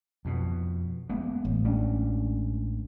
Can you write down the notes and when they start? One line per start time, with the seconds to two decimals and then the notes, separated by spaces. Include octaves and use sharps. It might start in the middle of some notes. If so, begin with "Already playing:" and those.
0.25 F2 B2
1.09 G#3 A#3 B3
1.45 A1
1.65 G#3 C#4 D4